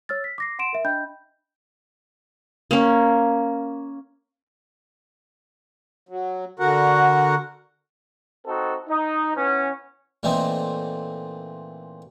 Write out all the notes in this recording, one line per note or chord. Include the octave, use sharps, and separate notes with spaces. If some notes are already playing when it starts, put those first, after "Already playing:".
C#5 E6 F6 A6
B6
D6 A#6 C7
F#5 C6 D7 E7
A#4 E5
D4 D#5 G5 B5 G6
A#3 C#4
F#3
D3 F#4 A#4 F#5
C4 D#4 F#4 A4
D#4
E3 B3 C#4
A#2 E3 A3 C4 D#4